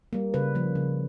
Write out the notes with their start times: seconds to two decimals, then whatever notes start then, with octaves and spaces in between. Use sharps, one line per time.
0.13 G3 A#3
0.34 C#3 B4
0.55 F3 A#3
0.75 C#3